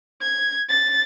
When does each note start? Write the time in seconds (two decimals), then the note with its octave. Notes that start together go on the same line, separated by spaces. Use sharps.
0.22 G#6
0.70 A6